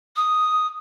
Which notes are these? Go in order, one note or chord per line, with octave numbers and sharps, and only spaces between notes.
D#6